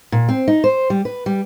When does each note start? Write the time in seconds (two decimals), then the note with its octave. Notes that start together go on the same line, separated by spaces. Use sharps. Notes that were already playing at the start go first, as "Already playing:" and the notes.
0.12 A#2
0.29 C4
0.48 D#4
0.64 C5
0.90 G3
1.05 B4
1.26 G3